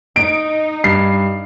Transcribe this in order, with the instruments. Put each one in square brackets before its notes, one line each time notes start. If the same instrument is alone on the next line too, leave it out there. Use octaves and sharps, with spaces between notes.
[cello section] D#4 [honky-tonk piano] D7
[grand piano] G2 [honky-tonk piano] C7